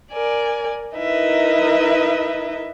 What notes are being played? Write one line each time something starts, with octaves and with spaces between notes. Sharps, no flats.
A#4 D5 G#5
D#4 E4 A#4 B4 D#5 E5